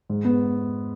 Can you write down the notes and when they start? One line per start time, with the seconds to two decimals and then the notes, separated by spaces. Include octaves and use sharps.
0.10 G#2
0.25 B3